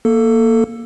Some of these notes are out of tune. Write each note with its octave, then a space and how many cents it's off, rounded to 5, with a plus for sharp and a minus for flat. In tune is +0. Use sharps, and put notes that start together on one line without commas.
A#3 +0 A4 +10